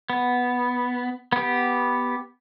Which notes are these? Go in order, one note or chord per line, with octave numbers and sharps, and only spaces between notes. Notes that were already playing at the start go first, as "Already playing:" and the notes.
B3
B3 G4